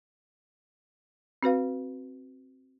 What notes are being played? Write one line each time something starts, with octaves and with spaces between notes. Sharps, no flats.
C4 F#4 B4 F5